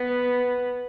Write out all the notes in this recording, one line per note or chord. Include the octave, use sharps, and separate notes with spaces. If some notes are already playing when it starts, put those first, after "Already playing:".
Already playing: B3